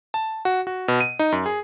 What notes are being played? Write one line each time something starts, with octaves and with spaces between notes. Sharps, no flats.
A5
F#4
F#4
B2
D#7
D#4
F#2
G#4